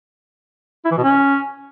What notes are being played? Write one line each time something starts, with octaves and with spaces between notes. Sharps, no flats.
E4
E3
B2
C#4